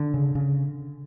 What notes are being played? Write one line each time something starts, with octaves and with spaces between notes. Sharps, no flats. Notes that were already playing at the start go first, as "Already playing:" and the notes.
Already playing: D3
C#3
C#3